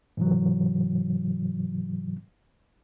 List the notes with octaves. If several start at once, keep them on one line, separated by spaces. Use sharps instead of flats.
G#2 C3 E3 F#3